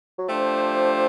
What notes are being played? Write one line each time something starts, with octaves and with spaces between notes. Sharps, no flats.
F#3
F3 A3 D4 G4 C5